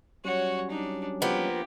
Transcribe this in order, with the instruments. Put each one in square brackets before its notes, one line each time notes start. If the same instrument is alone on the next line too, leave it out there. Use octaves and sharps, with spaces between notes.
[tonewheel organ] F#3 G3 C#4 [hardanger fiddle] F#4 C#5
[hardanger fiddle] D4 D#4
[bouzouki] F3 A#3 B3 [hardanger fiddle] G4